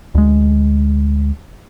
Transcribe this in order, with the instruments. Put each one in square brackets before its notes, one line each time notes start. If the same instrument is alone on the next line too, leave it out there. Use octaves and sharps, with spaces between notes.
[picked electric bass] D2 G#3